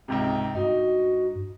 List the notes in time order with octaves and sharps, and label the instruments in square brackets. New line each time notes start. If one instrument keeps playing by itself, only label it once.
[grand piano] C#2 G#2 C3 [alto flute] G5
[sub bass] G2 [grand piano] D#4 [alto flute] F#4